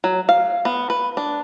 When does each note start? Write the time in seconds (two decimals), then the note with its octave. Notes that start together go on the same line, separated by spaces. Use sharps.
0.04 F#3
0.29 F5
0.65 B3
0.90 B4
1.17 D4